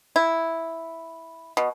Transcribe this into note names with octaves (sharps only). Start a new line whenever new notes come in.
E4
B2